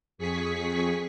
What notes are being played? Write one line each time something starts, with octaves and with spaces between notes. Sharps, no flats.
F2 G#4 C#6 B6